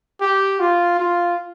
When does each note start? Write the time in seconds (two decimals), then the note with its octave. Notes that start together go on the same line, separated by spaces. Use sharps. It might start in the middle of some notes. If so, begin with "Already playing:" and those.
0.21 G4
0.60 F4
1.00 F4